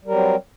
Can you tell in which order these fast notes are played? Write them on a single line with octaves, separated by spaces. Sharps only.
G3 A#4 F#3 C4